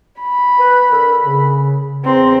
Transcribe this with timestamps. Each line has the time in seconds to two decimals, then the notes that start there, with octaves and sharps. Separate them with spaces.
0.20 B5
0.58 B4
0.91 D3 A4 A#4
1.24 C#3
2.05 E2 C4 A#5 C6